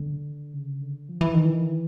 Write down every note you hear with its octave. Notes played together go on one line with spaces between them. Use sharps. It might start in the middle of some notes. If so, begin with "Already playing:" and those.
Already playing: D3
C#3
D3
F3
E3
D#3
E3